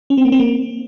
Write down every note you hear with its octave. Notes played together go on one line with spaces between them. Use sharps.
C#4
C4
A#3
C4
A#3